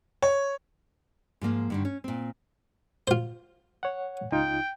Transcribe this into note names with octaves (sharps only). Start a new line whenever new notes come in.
C#5
G#2 F3 A#3 F4
G2 D3 D#3
C#4
A#2 C4
F4 C5
C#5 F#5
C#2 D#4 F4 G5